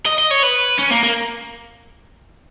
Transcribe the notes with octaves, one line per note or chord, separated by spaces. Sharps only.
D#5
D#5
C#5
B4
C#4
A#3
A#3